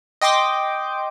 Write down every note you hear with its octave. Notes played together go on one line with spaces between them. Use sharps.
D#5 G5 C6 D6